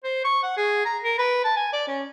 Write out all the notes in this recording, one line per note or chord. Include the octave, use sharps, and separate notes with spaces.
C5
C#6
F#5
G#4
A#5
A#4
B4
A5
G#5
D5
C#4